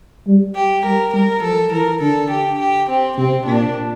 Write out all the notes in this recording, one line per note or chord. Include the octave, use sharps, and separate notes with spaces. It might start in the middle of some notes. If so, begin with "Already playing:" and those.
G3
G4
G3 A#4
G3 A#4
F3 A4
E3 A#4
D3 A4
G4
G4
C4
C3 C4
A#2 D4